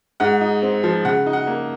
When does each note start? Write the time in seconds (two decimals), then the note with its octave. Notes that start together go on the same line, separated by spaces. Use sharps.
0.20 G#2 F#5
0.41 D#4
0.62 C4
0.83 F3
1.05 C#3 F#5
1.26 D#4
1.33 F#5
1.47 A#3